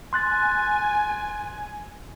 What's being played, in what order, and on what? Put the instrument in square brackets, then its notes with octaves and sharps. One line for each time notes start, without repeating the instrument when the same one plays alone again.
[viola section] G#5 [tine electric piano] C6 F#6 A6